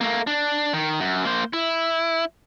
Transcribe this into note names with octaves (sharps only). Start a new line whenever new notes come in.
A3 A#3
D4
D#3
F#2
A#3 C5
E4